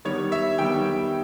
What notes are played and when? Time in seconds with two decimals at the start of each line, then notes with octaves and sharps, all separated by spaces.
0.05 D#3 G3 B3 C#5
0.32 E5
0.58 D#3 G3 B3 G5